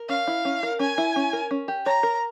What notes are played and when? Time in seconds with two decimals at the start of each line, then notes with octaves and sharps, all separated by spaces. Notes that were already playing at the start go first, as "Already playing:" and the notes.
Already playing: A#4
0.09 C#4 F5
0.27 E4
0.45 C#4
0.63 A#4
0.79 C#4 G#5
0.98 E4
1.16 C#4
1.33 A#4
1.51 C#4
1.68 G4
1.86 C#5 A#5
2.03 A#4